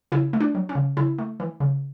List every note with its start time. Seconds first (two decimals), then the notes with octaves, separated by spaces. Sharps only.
0.12 C#3 E4
0.33 A3
0.40 D4
0.55 F#3
0.69 C#4
0.75 C#3
0.97 C#3 E4
1.19 A3
1.40 E3
1.60 C#3